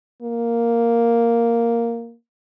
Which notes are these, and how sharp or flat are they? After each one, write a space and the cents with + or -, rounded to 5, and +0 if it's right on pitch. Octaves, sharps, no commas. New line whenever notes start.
A#3 +0